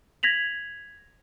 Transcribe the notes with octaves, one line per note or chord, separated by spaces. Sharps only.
G#6 A#6 B6 F7 F#7